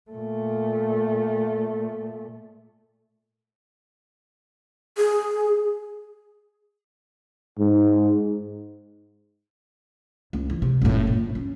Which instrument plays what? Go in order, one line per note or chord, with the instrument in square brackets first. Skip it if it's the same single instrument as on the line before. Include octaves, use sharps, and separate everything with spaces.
[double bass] A#2 A3
[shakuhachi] G#4
[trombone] G#2
[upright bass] C#2
E3
C3
F#1 A2
A#2
C#4